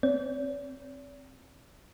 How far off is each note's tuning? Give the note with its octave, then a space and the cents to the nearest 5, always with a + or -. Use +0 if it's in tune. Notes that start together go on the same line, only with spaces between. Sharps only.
C4 +5 D5 -45